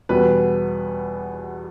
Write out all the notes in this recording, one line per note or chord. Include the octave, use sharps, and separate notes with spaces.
E2 B2 G3 B4